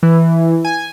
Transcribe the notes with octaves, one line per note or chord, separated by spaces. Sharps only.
E3
G#5